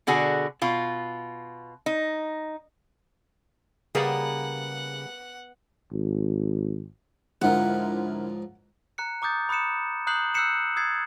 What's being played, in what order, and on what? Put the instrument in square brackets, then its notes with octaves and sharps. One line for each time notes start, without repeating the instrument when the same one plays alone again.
[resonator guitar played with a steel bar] B2 D3 F#4 G#4
B2 F4
D#4
[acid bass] C#3 [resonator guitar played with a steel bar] G3 A#3 G#4 [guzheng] B3 [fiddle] F#5
[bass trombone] G#1
[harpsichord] C#2 G#2 F3 [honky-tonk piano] D3 E4 A#4 [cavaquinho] F#5
[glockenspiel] A#5 F#6 C#7
A#5 D6 D#6 G6 A6
B5 D#6 F#6 C#7 E7
A#5 D#6 F#6 G6 C7 F#7
E6 F#6 G6 C7 C#7 E7
D#6 E6 G#6 A6 C7